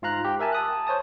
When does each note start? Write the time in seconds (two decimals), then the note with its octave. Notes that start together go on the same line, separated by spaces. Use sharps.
0.02 G#2 F4 F5 A#5 F#6
0.25 G4
0.39 A#4 E5 G#5 A5
0.52 A5 D#6 F#6
0.87 C5 C#5 A5 D#6